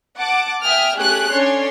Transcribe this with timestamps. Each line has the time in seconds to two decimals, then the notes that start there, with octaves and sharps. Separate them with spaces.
0.17 F#5 A5 D6
0.62 E5 G5 G#5 D#6 F6
0.97 A3 C#4 G4 G#4 G#5 F#6
1.32 C#4 D4 A4 C#5 C6